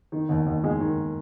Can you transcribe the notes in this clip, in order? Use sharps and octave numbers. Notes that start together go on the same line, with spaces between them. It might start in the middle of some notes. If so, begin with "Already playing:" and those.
D#3
D#2
D#2
G#3
D#3